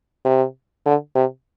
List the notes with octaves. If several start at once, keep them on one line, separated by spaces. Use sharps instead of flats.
C3
D3
C3